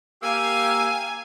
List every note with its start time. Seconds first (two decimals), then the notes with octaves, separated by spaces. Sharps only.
0.23 A#3 G4 F5 G#5 E6